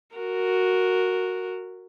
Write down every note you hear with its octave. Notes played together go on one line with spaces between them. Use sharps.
F#4 A#4